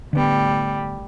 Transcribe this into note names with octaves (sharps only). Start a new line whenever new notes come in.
A2 D3 G3 B3